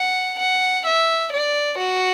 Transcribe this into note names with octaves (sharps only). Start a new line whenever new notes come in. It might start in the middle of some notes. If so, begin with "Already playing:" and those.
Already playing: F#5
F#5
E5
D5
F#4